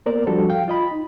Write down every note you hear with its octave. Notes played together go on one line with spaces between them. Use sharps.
A#3 B3 A#4 C5 D5
F3 G3 D4 F#4 G4 A4
F5 G5
F4 D#5 B5
D#4